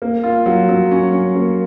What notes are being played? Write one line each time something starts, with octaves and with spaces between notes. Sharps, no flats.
A#3
F4
F#3
F#3
C#4
C#4
A#3